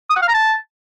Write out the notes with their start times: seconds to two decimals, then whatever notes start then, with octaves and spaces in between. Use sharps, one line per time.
0.10 D#6
0.16 F#5
0.22 F5
0.28 A#5
0.34 A5